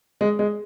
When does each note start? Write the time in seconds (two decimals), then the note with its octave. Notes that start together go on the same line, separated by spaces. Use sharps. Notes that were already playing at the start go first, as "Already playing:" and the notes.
0.21 G#3
0.39 G#3